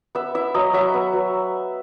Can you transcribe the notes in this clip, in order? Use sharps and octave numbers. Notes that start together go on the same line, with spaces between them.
B3 E5
E4 E5
F#3 D#5
F#3 E5
B3
F#3